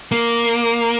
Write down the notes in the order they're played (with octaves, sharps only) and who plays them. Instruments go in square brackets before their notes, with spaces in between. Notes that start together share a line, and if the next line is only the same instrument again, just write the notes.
[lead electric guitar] A#3